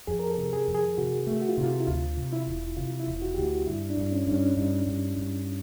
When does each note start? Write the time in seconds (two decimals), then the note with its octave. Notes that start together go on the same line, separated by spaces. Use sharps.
0.07 F2 G#4
0.19 A#4
0.30 A4
0.37 C3
0.53 G#4
0.68 F2
0.75 G#4
0.98 C3 F#4
1.27 A3
1.42 F#4
1.49 F4
1.57 C3 E4
1.63 F4
1.80 E4
1.87 D2 F4
2.17 C3
2.33 E4
2.47 E1
2.77 C3 F4
3.00 E4
3.08 E1
3.22 F#4
3.34 D2 G4
3.45 F#4
3.67 G2 E4
3.90 D4
3.97 G2
4.12 C#4
4.27 G2 D4
4.34 C#4
4.57 G2 D#4
4.86 G2
5.17 G2